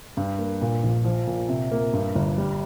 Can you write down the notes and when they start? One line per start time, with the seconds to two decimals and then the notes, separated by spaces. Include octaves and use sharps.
0.17 G2
0.39 A#3
0.61 A#2
0.83 A#1
1.05 F3
1.27 A#2
1.49 C3
1.72 A#3
1.93 G2
2.15 G1
2.38 G3